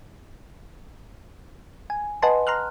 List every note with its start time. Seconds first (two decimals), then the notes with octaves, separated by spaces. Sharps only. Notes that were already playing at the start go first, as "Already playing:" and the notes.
1.90 G#5
2.22 B4 D#5 F#5 G#5 A5 C6
2.47 A#5 C6 F6 F#6